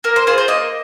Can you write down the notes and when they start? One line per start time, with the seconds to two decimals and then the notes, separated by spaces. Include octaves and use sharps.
0.04 A#3 A#4
0.16 C5
0.27 F4 G#4 C5
0.38 C5
0.48 A#3 D#5